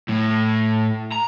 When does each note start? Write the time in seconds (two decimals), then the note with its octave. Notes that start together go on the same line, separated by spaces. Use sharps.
0.09 A2
1.12 A#5